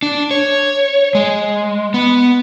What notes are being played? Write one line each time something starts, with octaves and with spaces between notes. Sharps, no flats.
D4
C#5
G#3
B3